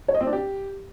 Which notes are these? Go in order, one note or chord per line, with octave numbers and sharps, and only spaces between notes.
C#5
D#5
C4
D4
G4